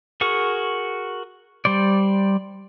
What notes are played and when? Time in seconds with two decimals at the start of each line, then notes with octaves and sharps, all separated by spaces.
0.21 F#4 G#4 A#4 C#6
1.65 G3 C5 D5